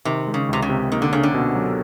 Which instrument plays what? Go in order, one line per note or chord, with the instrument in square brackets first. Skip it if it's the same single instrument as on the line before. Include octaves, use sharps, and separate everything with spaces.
[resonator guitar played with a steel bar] C3 [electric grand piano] D#3
[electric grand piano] G#3
[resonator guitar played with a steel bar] C#3
[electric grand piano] C#2 [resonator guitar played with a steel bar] C3
[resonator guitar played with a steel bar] C#3
[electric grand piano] C3
[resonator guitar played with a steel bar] D#3 [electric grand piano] A#3
[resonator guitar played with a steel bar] D3
[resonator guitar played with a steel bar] C#3 [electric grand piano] C#4
[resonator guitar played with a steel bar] D3
[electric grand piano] B2
F#3